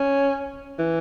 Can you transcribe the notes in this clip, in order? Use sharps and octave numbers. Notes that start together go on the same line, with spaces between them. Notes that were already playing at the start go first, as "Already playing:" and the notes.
Already playing: C#4
E3